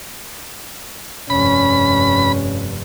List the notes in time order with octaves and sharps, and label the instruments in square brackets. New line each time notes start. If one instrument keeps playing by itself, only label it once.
[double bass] F1 G2 [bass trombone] C#4 [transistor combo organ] B5